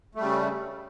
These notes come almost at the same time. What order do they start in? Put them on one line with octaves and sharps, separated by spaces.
A3 G3 C#3